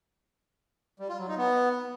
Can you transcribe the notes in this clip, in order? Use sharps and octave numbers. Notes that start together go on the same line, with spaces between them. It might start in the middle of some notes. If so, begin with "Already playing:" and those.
G3
F4
F#3
D#4
B3